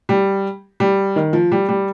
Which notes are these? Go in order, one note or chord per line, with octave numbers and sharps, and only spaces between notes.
G3
G3
D#3
F3
G3
G3